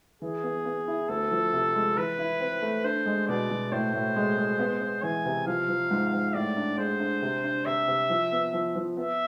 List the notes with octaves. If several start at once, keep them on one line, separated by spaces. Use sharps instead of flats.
E3 G#4
B3
B3
E4
D2 A4
F3
C3
G#3
E3 B4
E4
C4
A3
D4 C5
G#3
B2 D5
B2
A2 C5
A2
G#3
G#3
B3
B3
E3 G#5
C3
F3 F5
F3
G#2
G#2
A2 D5
D4
G#3 C5
D4
C3
D4
C3 E5
C3
F3
B3
F3
F3
B3 E5